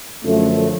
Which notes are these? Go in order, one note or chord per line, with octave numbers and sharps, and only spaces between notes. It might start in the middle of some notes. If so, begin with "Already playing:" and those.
F#2 D3 F3 A3